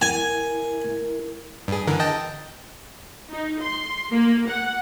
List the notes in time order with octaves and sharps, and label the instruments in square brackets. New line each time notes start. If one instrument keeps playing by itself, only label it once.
[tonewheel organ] E4 A#4 [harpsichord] G#5
[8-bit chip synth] G2 G#4
D3 E3 A#4
D#5 G5 A5
[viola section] D#4
C6
A#3
F#5